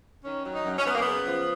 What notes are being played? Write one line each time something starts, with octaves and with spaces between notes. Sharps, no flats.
D#3 C#4
F#3
D#4
F#2
C#4
F#2 B3
A#3
C#3 B3
F3